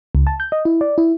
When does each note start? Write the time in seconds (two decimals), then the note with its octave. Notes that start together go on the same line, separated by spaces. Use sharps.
0.15 C#2
0.27 A5
0.40 G6
0.52 D#5
0.65 E4
0.81 D5
0.98 E4